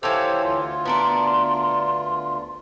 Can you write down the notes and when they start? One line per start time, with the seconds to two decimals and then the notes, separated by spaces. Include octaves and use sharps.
0.03 E3 G4 A4 C5 C#5 F5
0.44 D2 F4 C6
0.86 B3 D4 A#4